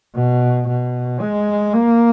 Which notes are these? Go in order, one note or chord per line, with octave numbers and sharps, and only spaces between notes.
B2
B2
G#3
A#3